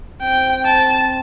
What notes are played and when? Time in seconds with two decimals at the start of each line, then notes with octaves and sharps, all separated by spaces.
0.21 C4 G5
0.65 A5